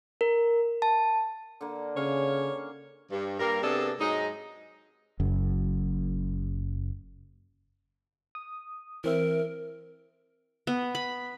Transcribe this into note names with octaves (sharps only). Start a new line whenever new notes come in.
A#4
A5
D3 A#3
C#3 C#5 F5 G#5
G2
G2 G3 A#3 A#4
C3 B3 D4 G#4 A4
G#2 F#3 G#3 D#4
F#1 F#2
D#6
E3 C4 A#4 E5
B3
B5